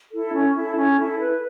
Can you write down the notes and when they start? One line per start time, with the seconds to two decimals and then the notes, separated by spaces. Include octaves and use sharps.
0.13 E4 A4
0.34 C#4
0.55 E4 A4
0.77 C#4
0.98 E4 A4
1.20 B4